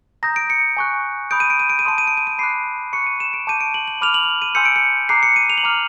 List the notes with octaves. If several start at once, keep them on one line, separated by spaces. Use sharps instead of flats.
A#5 D#6 G6 A#6
D7
C#7
G#5 C#6 F#6
B5 D#6 G6 D7
D#7
D7
D#7
D7
D#7
A5 C6 D#6 D7
D#7
D7
D#7
D7
B5 D6 F#6 C7
C#6 F#6 C#7
D#7
E7
D7
A5 D6 G6 D#7
D7
F#7
F#7
B5 D6 F6 F7
F#7
D#7
G#5 C6 E6 G6 C#7
D7
C#7
A#5 D6 F#6 C7
C#7
D#7
F7
F#7
A#5 D6 F6 F7